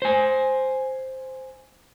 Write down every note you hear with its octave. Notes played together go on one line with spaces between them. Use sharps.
C5 G#5